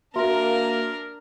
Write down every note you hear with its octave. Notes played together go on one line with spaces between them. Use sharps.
A#3 D4 F#4 A#4 E5 C6